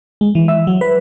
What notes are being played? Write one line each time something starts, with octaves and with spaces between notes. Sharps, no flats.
G#3
E3
E5
F#3
B4